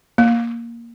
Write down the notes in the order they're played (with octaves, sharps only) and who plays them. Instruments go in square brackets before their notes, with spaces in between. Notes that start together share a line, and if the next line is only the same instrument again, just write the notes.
[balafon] A#3